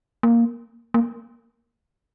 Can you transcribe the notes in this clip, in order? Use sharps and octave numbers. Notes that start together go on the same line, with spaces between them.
A#3
A#3